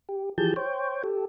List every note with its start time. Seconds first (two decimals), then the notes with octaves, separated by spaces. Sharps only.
0.09 G4
0.38 E3 F3 G4 G#4 A5 G6
0.56 C5 C#5 G5
1.04 G4 A4